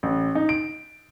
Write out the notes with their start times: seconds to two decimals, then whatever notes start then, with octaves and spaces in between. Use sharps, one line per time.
0.03 A1
0.35 D#4
0.49 D7